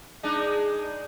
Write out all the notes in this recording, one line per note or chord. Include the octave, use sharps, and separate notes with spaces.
G#3 D4 D#4